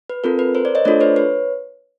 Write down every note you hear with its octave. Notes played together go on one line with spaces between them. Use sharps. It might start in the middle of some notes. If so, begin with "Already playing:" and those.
B4
C4 F4 A4 A#4
B4
A#4 C5
C5 D5
C#5 D#5
A3 D4 F4 A4 C5 D5
B4 C#5
B4 C#5